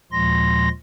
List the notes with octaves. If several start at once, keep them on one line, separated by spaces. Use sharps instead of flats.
D#2 A#2 F3 G#3 C6 A#6